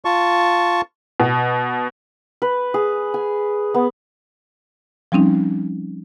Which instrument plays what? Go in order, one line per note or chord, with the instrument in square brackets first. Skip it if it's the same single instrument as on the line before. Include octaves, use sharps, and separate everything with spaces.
[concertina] F4 A5 C#6
[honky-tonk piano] B2
[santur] B4
G#4
G#5
B3
[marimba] F3 G3 C4 C#4 D#4